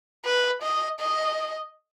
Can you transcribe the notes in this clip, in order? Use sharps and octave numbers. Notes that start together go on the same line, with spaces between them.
B4
D#5
D#5